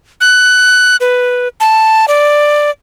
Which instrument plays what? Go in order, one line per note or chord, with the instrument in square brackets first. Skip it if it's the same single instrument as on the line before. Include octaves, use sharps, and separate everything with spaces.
[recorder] F#6
B4
A5
D5